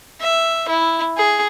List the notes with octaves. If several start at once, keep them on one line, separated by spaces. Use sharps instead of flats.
E5
E4
G#4